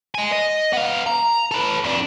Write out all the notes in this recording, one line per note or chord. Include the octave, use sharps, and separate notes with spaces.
D#5 G#5
D#5
B3 F5
A#5
A4 B4
F2 D4